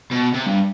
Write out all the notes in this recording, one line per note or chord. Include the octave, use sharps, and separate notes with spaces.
B2
C3
G2